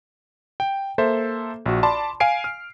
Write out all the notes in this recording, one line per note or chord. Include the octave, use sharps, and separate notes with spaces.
G5
A#3 A4 C5 E5
A#1 F#4
D5 A5 B5 C6 D6
F5 G#5 C7 D7
F6